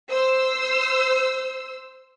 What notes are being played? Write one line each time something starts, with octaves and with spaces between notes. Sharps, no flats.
C5 E6